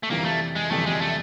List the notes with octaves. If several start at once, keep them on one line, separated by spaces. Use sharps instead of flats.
A3
F2 C3 E3 G3 A#3
A3
G#3
F2 C3 E3 G3 A3
G#3
A3